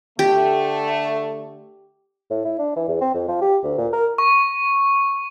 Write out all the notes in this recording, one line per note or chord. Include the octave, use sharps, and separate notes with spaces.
D3 A3 G4
A2
E4
D4
E3
E2
C4
F2
F3
G4
D2
A#2
A#4
C#6